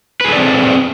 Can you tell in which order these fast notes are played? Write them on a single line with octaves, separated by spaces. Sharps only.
B4 G#4 A4 D5 C4